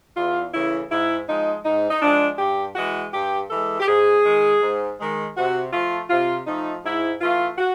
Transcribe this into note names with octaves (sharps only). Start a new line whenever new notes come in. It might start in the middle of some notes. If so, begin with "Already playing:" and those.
E2 F4
C#3 E3 A3 E4
G#2 E4
F3 G#3 D#4
G#2 D#4
D#4
F3 G#3 D4
G2 G4
E3 G#3 F#4
G2 G4
E3 G#3 A4
G4
G#2 G#4
D#3 G#3
G#2
D#3 G#3
C3 F#4
F3 A3 F4
C3 F4
F3 A3 D#4
G#2 E4
E3 A3 F4
F#4